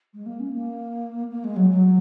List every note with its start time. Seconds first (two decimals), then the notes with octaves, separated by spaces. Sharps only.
0.14 G#3
0.26 A#3
0.40 C#4
0.53 A#3
1.31 A#3
1.44 G#3
1.56 F#3
1.70 F#3